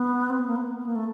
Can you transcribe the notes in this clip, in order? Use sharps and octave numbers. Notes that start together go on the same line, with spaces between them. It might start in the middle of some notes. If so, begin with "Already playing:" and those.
Already playing: B3
C4
B3
A#3
B3
B3
A#3
A3